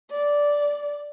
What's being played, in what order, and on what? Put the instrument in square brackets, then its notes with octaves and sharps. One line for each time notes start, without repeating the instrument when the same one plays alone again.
[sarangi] D5